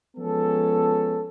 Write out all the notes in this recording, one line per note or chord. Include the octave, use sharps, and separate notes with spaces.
F3 G#3 B3 C#4 A4